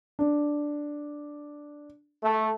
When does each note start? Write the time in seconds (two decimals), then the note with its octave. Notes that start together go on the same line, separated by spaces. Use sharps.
0.19 D4
2.23 A3